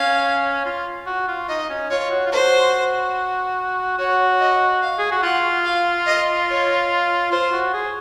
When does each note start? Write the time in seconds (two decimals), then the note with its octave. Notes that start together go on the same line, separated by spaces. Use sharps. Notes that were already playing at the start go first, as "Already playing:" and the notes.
Already playing: C#4 F5
0.65 F4
1.06 F#4
1.28 F4
1.49 D#4 D#5
1.69 C#4
1.90 F4 C#5
2.10 F#4
2.26 F4
2.31 F#4 C5
3.98 F#4 C#5
4.40 D#5
4.82 F5
4.99 G#4
5.11 F#4
5.23 F4 F#5
5.65 F5
6.06 D#5
6.48 C#5
7.31 F4 C5
7.52 F#4
7.73 G#4